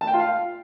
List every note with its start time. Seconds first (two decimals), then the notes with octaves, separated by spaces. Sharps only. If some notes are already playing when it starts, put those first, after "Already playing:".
0.01 A5
0.07 G5
0.14 F4
0.20 F5